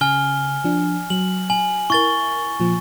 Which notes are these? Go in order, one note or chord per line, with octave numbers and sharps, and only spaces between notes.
C#3 G#5 F6 G7
F3 D4
F#3 F#7
G#5 F#7
E4 A#4 C#6 A6 G7
A#2 F3